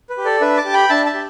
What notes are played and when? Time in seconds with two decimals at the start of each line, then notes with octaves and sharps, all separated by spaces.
0.10 B4
0.17 G4
0.25 A4 D5
0.41 D4 B4 E5
0.57 A5 D6
0.65 G4
0.73 G5 B5
0.89 D4 E5 A5
1.06 E5 A5
1.14 G4